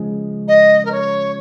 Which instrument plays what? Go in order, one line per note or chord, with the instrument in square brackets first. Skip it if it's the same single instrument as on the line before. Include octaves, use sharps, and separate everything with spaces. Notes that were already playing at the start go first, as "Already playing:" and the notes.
Already playing: [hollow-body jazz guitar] C#3 F3 G#3
[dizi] D#5
A#4
C#5